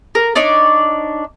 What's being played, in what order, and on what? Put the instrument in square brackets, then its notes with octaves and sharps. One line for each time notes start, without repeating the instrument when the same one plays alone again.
[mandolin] A#4
D4 D#4 C#5 D5